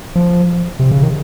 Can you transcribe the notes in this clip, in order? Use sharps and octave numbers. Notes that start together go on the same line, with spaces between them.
F3
C3
C#3
D#3